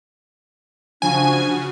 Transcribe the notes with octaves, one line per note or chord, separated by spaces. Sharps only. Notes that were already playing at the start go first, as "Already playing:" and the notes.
C#3 F3 D4 F#4 G#5